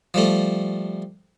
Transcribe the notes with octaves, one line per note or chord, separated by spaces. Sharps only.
F3 G3 A3